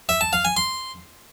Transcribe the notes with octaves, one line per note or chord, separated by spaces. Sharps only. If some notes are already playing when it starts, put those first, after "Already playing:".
E5
A5
F5
G#5
C6